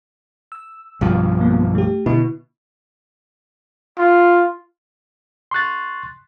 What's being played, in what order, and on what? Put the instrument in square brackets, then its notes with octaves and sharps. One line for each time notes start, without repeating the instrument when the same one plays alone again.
[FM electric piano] E6
[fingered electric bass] B1 G2 F3
[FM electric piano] A#3 B3
A3 G4
[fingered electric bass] B2 [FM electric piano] D3 E4
[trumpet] F4
[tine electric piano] C6 C#6 F#6 A6